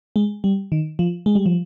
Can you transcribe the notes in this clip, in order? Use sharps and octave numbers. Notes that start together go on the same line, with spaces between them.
G#3
G3
D#3
F3
G#3
G3
F3